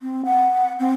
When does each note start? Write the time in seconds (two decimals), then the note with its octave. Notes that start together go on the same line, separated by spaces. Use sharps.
0.01 C4
0.25 F#5
0.79 C4